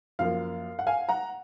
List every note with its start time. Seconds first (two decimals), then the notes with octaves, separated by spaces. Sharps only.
0.19 F#2 F3 A#3 F5
0.79 F#5
0.87 F5 G#5
1.09 F#5 A#5